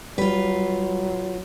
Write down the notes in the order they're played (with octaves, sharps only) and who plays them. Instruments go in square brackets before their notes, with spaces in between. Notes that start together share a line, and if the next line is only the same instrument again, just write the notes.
[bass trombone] F#3 [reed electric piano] G3 [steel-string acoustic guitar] F4 B4